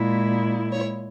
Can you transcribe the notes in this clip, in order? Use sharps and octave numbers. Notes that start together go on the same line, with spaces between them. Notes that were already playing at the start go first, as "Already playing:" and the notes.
Already playing: A#2 G#3 E4
C#5